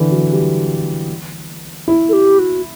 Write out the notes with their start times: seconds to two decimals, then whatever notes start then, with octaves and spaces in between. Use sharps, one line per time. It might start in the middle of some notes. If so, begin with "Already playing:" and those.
Already playing: D3 E3
0.12 F#3
0.31 G3
1.88 E4
2.09 A4
2.13 G4
2.39 F#4